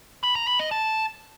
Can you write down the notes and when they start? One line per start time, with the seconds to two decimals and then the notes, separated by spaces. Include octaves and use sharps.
0.23 B5
0.35 A#5
0.47 B5
0.59 D#5
0.71 A5